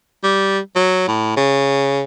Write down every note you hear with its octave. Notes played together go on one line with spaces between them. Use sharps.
G3
F#3
A2
C#3